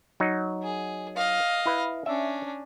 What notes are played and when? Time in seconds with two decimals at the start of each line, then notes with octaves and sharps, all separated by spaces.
0.20 F#3 D#4
0.63 G#4
1.16 D#5 F5
1.66 E4 B4
2.06 C#4 D4 E5